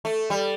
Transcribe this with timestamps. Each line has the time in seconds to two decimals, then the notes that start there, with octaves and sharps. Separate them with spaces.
0.05 A3
0.30 G3